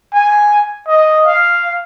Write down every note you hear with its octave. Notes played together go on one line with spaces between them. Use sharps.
G#5
D#5
F5